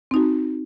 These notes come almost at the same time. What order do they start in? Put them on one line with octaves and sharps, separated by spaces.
C4 D#4 F#4